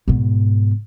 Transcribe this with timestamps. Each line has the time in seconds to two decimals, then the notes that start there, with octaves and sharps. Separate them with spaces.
0.08 G#2 B2